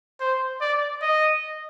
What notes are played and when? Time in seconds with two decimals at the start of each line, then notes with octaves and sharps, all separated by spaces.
0.20 C5
0.61 D5
1.02 D#5